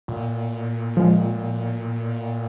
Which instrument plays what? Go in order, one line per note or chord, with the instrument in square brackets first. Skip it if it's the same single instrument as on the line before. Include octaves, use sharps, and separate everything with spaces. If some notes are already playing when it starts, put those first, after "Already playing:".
[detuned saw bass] A#2
[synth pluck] F3 G#3